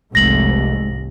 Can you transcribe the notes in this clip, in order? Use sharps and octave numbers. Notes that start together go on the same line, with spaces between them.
F1 C2 G#2 G#3 A3 A#6 F#7